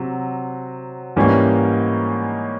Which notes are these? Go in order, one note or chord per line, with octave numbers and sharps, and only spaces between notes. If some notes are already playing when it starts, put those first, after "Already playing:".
Already playing: C3 F#3
G#2 E3 G3 A#3 C#4